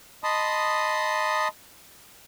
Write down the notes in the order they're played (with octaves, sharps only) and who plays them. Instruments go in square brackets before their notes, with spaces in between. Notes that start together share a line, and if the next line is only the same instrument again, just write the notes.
[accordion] D#5 A5 B5 C6 D#6